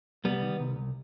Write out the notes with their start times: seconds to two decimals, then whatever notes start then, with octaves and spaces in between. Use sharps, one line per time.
0.24 C2 G3 B3
0.42 D#3
0.60 C2
0.76 C2